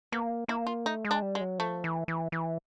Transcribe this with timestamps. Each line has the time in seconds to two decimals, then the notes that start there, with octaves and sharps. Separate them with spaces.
0.12 A#3 B3
0.48 A#3 E4
0.67 F4
0.86 A3 D#4
1.05 G#3
1.11 D4
1.22 G3
1.35 G#3
1.40 F#3
1.59 F3 A3
1.84 E3
2.08 E3
2.32 E3